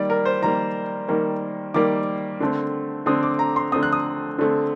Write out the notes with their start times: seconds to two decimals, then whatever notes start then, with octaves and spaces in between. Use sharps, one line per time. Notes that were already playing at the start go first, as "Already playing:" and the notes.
Already playing: D#3 G3 A#3 D5
0.10 A#4
0.25 C5
0.42 D#3 G3 A#3 A#5
1.08 D#3 G3 A#3
1.74 D#3 G3 A#3 D6
2.40 D3 A3 C4
3.06 D3 A3 C4 D#6
3.23 D6
3.39 A#5
3.56 C6
3.72 D3 A3 C4 D#6
3.83 F#6
3.92 D#6
4.38 D3 A3 C4